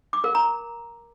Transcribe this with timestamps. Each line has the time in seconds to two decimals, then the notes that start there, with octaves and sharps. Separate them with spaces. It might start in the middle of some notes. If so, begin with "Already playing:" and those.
0.13 D6
0.24 A#4
0.35 A#5